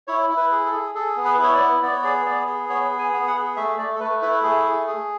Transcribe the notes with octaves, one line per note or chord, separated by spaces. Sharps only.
E4 C#5
E4
B4
G#4
A4
G#4
G#4 A4
B3
B4
E4
C#5
D5
B3
B3 D5
C#5
G#4 D5
B3 D5
G#4
B3 C#5
G#4
G#5
B3
F#5
G#4
A3 E5
A3 D5
A4
A3 B4
E4 B4
A3 G#4
G#4
G#4